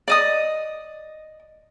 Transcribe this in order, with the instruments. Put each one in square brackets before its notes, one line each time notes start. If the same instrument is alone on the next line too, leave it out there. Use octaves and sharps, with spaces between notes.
[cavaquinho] D5 D#5 D#6